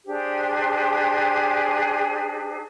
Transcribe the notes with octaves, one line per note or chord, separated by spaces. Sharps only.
D4 G4 G#4 C5